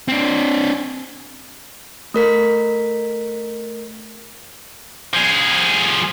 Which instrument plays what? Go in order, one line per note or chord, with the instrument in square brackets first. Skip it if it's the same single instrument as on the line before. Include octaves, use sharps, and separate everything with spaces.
[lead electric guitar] C4 D4
[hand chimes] A3 A#4 B6
[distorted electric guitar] F3 G#4